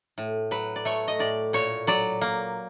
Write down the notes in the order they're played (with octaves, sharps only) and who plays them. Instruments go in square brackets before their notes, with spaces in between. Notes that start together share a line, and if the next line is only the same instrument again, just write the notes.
[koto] A2
F#3 B4
D5
A3 C#5
D#5
A2 D5
A#2 C#5
F#3 D5
A#3